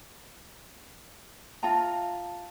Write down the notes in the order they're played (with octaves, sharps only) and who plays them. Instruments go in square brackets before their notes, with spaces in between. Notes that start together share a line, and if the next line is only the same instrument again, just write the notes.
[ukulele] F4 A#5 [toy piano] E5 G5 A5